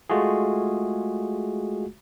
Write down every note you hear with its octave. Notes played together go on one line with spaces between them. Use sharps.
G#3 A3 F4 F#4 G#4